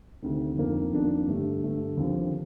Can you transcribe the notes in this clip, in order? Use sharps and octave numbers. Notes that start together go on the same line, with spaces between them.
D2 C3 D#3
F2 D#3 A#3 D4
F2 D#3 A#3 D4
G2 D3 A3 D4 G4
G2 D3 A3 D4 G4
D#2 D3 F3 C4 F4